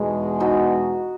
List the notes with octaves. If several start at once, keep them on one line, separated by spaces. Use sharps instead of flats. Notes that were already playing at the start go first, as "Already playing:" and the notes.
Already playing: E2 B2 G#3 D#4
D#4 F#4